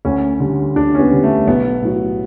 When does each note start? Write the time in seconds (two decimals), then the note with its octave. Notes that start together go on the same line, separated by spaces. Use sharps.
0.05 D2 C#4
0.40 D3 G3
0.76 D2 D4
0.95 C#4
0.99 B3
1.11 D3 G3
1.24 A3
1.47 B1 B3
1.82 A2 F#3